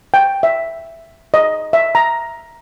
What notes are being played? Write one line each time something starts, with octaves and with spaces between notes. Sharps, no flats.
G5
E5
D#5
E5
A#5